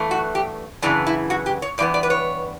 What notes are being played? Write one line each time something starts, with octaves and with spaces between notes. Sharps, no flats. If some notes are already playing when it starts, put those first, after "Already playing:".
Already playing: G2 E3 A3
F#4
G4
F#2 C#3 E3 B3 D4
E4
F#4
G4
C#5
G2 E3 B3 D5
D5
B4
C#5